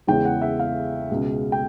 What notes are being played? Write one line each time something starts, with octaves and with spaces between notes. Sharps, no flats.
E2 C#3 E3 G#3 G5
F#5
E5
F5
C#2 B2 G#3
G5